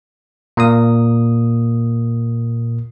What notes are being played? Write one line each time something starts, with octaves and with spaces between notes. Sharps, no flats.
A#2 A#3 D#6